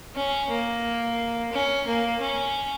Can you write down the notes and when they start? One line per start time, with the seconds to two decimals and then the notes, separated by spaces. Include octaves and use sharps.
0.15 C#4
0.50 A#3
1.52 C#4
1.87 A#3
2.21 C#4